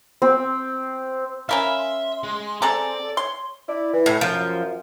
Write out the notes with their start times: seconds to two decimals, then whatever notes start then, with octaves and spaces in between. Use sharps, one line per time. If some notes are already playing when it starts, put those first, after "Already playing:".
0.22 C4
1.49 C#4 A#4 E5 F5 B5
1.78 C6
2.24 G#3
2.62 C4 G#4 A4 D5 A#5
3.02 A4
3.17 C#5 C6
3.68 E4 D5
3.93 E3
4.06 A2
4.21 F#2 F3